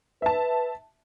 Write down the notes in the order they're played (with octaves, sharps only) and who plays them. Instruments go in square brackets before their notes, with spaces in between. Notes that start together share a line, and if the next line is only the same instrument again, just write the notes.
[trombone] B4 [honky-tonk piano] E5 A5